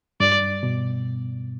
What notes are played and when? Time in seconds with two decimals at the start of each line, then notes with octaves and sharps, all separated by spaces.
0.20 G2 D5
0.63 B2